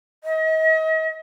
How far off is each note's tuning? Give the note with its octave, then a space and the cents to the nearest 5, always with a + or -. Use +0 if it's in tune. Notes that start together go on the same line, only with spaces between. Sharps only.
D#5 +40